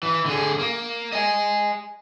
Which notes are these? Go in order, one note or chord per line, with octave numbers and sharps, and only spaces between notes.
E3
D3 G#4
A#3
D#5 G#5